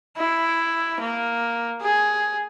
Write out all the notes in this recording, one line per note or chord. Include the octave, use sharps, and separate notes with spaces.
E4
A#3
G#4